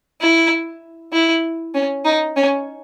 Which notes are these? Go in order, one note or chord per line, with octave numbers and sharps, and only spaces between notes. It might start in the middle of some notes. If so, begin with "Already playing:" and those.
E4
E4
C#4
D#4
C#4